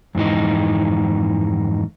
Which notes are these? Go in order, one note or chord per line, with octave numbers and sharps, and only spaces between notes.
F2 G#2 E3 D#4